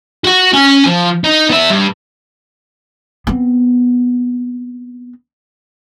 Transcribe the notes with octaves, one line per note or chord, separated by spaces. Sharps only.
F#4 F#5
C#4 G#5
F3
D#4
B3 E5
G2
B3 C4